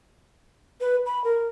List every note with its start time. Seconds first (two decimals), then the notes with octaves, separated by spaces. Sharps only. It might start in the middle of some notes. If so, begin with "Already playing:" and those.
0.81 B4
1.06 B5
1.24 A#4